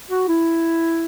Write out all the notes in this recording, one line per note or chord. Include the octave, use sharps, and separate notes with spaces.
F#4
E4